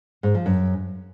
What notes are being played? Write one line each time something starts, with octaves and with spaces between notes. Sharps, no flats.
G#2
F3
F#2